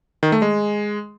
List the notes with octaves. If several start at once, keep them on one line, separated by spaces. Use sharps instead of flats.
D#3
A3
G#3